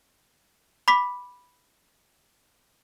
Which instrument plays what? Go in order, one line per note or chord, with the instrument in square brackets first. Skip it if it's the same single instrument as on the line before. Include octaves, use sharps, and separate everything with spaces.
[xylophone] B5 D6 B6